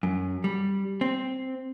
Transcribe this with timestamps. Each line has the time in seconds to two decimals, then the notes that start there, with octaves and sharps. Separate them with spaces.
0.03 F#2
0.44 G3
1.01 C4